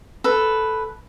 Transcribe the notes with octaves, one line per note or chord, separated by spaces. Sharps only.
A4 B4